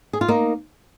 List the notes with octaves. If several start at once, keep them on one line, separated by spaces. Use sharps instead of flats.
G#4
F4
A#3 D#4